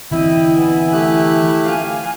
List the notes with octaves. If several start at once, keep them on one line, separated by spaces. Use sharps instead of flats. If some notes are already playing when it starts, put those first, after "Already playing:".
D3 E3 C4 E4 D#5 G5
B3 G#5
A3 G4 F#6
F5 G#5